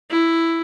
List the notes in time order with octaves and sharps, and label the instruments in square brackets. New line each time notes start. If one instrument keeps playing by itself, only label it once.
[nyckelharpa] E4